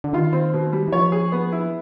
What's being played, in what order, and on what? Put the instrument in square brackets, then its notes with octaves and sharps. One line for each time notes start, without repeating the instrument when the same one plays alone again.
[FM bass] D3
[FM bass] D#3 [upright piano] F4
[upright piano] C4
B2
G3
[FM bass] E3
[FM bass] F3 [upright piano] C#5
[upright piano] G#4
B3
E4